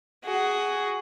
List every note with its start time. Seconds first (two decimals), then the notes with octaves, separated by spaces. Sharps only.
0.25 F#4 G#4